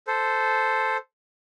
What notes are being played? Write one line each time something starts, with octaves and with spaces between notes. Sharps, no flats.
A4 C5